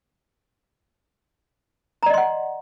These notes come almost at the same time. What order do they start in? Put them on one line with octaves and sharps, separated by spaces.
A#5 D5 D#5 C6 F#5